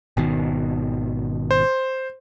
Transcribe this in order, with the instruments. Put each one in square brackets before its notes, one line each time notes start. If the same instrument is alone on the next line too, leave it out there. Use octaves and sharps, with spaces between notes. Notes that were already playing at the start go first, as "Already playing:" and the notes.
[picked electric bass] G#1 B2 D#3
[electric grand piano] C5